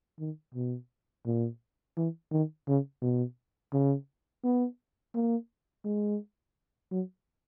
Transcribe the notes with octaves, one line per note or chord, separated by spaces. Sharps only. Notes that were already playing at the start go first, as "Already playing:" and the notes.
D#3
B2
A#2
E3
D#3
C#3
B2
C#3
B3
A#3
G#3
F#3